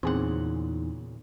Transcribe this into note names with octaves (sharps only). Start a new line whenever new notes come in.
E2 A#2 C#3 C4 D#4 G#4 C5 F#5